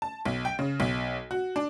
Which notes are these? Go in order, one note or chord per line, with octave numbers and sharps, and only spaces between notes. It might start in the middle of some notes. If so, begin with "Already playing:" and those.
A5
B1
G5
C#3
B1
F#4
D4